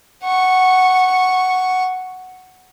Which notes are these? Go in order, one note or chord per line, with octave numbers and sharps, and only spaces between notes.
F#5 C#6